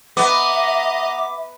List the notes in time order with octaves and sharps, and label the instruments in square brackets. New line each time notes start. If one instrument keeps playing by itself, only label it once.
[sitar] B3 [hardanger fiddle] D#5 A#5 [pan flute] E5 [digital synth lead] D6